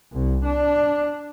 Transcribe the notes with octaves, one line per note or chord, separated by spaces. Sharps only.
C2
D4